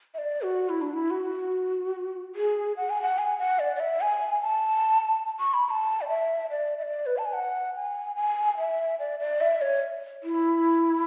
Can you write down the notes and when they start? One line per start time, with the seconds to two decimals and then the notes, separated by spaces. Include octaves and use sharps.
0.14 E5
0.18 D5
0.42 F#4
0.69 E4
0.81 D4
0.94 E4
1.11 F#4
2.36 G#4
2.77 F#5
2.90 G#5
3.02 F#5
3.18 G#5
3.39 F#5
3.59 D5
3.76 D5
3.80 E5
4.01 G#5
4.42 A5
5.40 C#6
5.54 B5
5.67 B5
5.71 A5
6.01 D5
6.09 E5
6.51 D5
6.78 E5
6.83 D5
7.06 B4
7.17 A5
7.26 G#5
7.33 F#5
7.75 G#5
8.16 G#5
8.58 E5
8.99 D5
9.20 D5
9.41 E5
9.61 C#5
10.24 E4